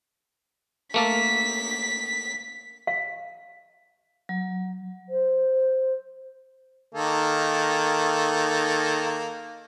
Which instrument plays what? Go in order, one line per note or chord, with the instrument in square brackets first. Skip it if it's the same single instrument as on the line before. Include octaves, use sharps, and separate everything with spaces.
[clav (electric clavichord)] A3 A#3 A4 [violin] B6
[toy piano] F5
[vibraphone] F#3
[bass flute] C5
[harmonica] D#3 A#3 A4